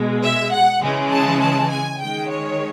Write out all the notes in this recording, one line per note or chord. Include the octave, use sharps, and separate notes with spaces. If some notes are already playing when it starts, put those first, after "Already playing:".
Already playing: B2 G#3
E5
F#5
C#3 E3 G#3
A5
A5
G#5
D#3 G#3 G5
C#5